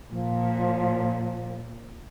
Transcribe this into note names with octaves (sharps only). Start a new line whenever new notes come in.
A#2 F3